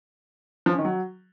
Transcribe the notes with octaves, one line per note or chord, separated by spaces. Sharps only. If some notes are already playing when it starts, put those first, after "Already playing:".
F3
C#4
D#3
F#3